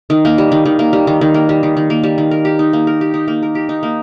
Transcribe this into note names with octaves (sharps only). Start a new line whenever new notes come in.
D#3
A#3
G3
D#3
D#3
A#3
G3
D#3
D#3
A#3
G3
D#3
D#3
A#3
G3
D#3
A#4
G4
D#4
A#3
A#4
G4
D#4
A#3
A#4
G4
D#4
A#3